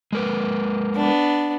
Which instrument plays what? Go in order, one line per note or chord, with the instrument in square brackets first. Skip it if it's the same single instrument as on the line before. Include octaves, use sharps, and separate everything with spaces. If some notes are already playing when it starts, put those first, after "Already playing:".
[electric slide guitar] G#3 A#4 B4
[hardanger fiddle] B3 D4